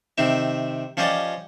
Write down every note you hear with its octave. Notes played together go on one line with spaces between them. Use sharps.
C3 D#3 C4 E5
F3 C#4 F4 G4 D5 D#5